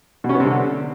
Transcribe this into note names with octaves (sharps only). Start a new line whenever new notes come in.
B2
C#4
B3
C3
D3